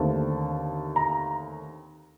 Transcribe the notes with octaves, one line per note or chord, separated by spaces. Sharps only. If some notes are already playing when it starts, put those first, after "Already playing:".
Already playing: D#2 D3 A3 C4 A5
A#5